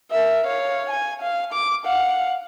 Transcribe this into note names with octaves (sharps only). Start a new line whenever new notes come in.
A#4 E5
C#5 F5
G#5
F5
D6
F5 F#5